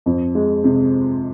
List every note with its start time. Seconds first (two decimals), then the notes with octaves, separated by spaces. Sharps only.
0.06 F2
0.35 G#3
0.64 C3